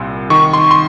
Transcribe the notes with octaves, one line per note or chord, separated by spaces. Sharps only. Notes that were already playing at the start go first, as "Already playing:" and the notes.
Already playing: C2 A#2 C6
D#3 C#6
C6
C6